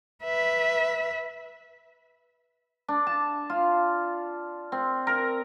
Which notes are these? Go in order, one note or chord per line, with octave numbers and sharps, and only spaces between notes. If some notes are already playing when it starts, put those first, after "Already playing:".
B4 E5
D4
A5
F4
C4
A#4